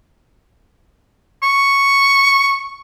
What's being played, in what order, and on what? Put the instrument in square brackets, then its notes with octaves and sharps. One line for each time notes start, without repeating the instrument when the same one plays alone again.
[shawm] C#6